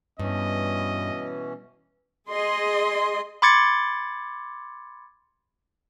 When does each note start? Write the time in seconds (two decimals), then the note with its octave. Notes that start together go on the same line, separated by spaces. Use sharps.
0.19 G2 B2 E3 C#4 D#5
2.29 G#4 D#5 C6
3.42 B5 C6 D6 G#6 A6 C#7